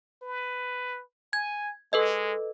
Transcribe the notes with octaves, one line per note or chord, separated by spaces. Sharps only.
B4
G#5 G#6
G#3 A4 B4 D#5